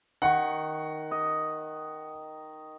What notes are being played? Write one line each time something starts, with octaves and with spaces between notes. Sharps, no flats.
D#3 F#5 C#6
D#5